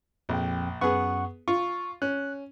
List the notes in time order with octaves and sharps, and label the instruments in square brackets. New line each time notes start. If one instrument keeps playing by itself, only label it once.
[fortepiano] A#1 [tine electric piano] F2 G5
[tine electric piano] F#2 F#5 C#6 [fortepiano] B3 G#4
[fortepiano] F4 [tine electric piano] C#6
[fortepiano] C#4 [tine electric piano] F#6